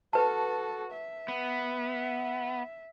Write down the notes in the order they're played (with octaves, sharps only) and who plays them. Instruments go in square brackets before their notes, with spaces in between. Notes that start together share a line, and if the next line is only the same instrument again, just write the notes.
[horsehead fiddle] F#4 A4 [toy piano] B4 A5
[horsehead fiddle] E5
[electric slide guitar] B3